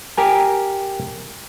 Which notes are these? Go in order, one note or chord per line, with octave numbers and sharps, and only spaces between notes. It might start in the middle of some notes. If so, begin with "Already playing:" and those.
G4 A#4 G#5